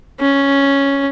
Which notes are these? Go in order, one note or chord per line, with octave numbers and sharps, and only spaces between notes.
C#4